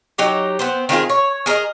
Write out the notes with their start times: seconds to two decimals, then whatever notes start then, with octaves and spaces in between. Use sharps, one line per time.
0.18 F#3 D#4 G4 A#5
0.59 B3 C4 C5
0.89 D#3 C4 F4 G#4
1.10 C#5
1.46 G#4 A#4 C5 D#5